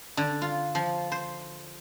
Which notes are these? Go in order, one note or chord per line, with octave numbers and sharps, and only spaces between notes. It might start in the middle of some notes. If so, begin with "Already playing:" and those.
D3
F4
F3
C5